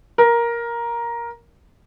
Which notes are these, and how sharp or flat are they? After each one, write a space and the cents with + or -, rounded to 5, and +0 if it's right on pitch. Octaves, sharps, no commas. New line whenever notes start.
A#4 +10